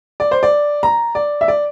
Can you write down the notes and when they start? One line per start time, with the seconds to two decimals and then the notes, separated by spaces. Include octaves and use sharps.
0.20 D5
0.31 C5
0.43 D5
0.83 A#5
1.15 D5
1.41 E5
1.48 D5